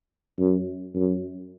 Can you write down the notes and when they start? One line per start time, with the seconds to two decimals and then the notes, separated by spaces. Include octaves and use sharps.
0.39 F#2
0.95 F#2